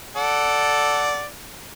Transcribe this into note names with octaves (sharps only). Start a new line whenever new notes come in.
A4 D5 F#5